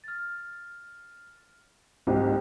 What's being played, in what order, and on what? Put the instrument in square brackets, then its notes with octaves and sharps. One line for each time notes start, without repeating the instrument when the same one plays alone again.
[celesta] F6 A6
[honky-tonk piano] C2 G#2 [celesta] G4 C5 G5